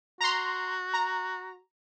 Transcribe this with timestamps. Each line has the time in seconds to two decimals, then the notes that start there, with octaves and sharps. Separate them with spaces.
0.21 F#4 A#5 C6
0.94 A#5